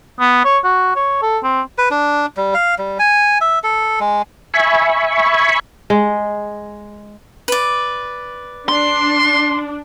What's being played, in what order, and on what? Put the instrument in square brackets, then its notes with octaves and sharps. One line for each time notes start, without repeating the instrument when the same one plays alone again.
[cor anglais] B3
C#5
F#4
C#5
A4
C4
[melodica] B4
D4
G3
F5
G3
G#5
E5
A4
G#3
[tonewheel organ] E5 G#5 B5 C#6
[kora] G#3
[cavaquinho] B4 D5
[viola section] D4 [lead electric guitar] C6